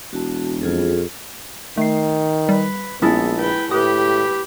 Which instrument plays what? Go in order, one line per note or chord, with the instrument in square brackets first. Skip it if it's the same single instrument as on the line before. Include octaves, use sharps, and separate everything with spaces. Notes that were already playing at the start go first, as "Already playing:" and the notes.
[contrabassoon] E1 [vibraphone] F#4 A5
[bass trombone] F2 [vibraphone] F4 G#4 A4
[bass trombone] D#3 [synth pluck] A3 C7
[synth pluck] G3 [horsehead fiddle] B4
[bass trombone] A#1 [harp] G#3 E4 A4 [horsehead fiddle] B3 [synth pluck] C#4
[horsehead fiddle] B4 G5
[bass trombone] A2 [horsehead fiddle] G4 B4 [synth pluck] D#6